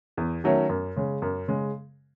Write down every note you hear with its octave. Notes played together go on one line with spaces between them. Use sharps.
E2
D#3 F#3 A3 C#4
F#2
C#3 G#3
F#2
C#3 G#3